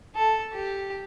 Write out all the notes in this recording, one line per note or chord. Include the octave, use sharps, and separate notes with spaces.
A4
G4